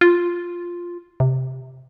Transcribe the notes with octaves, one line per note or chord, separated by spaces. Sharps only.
F4
C3